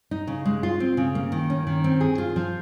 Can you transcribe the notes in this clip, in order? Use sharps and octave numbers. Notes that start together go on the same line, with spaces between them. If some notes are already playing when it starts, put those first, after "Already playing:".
D#4
C#3
G#3
F4
C4
C#3
A#3
D#3
C#4
D#3
C4
G#4
F4
F3